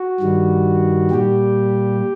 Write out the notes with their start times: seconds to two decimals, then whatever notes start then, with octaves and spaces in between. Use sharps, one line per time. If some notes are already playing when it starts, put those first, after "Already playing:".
Already playing: F#4
0.20 G2 D#3 G3
1.11 A#2 G3 G4